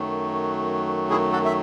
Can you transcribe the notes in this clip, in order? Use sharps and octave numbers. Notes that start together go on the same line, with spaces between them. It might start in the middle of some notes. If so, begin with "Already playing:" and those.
Already playing: F#2 D#3 F#3 A3
E4 G#4
F#4 A4
E5